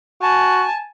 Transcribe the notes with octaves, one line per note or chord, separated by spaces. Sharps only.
F#4 G#5 A5